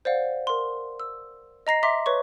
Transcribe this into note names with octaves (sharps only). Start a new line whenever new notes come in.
C5 D5 F5 F#5
A#4 C6
E6
D#5 A#5 A#6 C7
E5 A#5 C6 D6 B6
B4 C#5 C#6